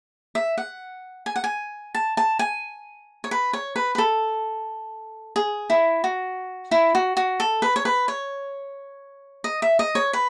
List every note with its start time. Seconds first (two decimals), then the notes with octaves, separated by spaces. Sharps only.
0.35 E5
0.58 F#5
1.26 G#5
1.36 F#5
1.44 G#5
1.95 A5
2.17 A5
2.39 G#5
3.24 C#5
3.31 B4
3.53 C#5
3.76 B4
3.95 B4
3.98 A4
5.36 G#4
5.70 E4
6.04 F#4
6.71 E4
6.95 F#4
7.17 F#4
7.40 A4
7.62 B4
7.76 C#5
7.85 B4
8.08 C#5
9.44 D#5
9.62 E5
9.79 D#5
9.95 C#5
10.13 B4